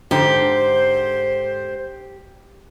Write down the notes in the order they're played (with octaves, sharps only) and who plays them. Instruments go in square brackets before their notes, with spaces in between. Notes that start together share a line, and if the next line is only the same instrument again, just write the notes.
[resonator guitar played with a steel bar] G#2 D3 [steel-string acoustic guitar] G4 [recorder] C5